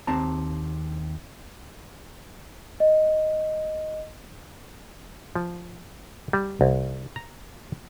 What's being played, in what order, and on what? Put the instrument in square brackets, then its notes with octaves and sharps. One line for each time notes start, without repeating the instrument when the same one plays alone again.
[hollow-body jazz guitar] D#2 C4 A5 A#5
[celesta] D#5
[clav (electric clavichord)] F3
G3
C2
A#5